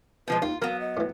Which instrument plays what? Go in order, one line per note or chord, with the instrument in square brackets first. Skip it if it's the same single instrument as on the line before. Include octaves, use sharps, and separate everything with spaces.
[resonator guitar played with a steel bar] B2 F3 G#3 [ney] B4
[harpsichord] D#2 [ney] D#4 [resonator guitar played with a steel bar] F4
[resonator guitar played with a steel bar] F#3 B3 [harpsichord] A#4 [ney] F5
[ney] D#5
[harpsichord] A2 E3